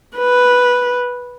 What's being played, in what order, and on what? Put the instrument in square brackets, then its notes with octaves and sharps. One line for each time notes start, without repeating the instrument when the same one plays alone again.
[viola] B4